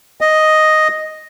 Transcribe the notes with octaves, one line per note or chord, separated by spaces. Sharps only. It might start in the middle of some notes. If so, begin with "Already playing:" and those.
D#5